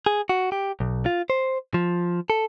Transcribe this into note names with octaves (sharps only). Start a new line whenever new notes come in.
G#4
F#4
G4
B1
F4
C5
F3
A4